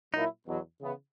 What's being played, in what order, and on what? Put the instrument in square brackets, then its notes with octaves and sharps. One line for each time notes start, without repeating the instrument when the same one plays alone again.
[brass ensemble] A#2 F#3 A#3 E4 [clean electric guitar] D#4
[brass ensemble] E2 B2 F#3
C#3 E3 B3